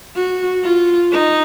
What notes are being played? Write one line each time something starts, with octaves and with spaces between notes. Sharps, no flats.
F#4
F4
D#4